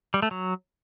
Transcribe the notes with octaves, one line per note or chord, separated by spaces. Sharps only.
G3
A3
F#3